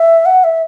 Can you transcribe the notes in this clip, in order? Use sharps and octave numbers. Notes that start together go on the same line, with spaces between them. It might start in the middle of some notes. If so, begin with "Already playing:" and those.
Already playing: E5
F#5
E5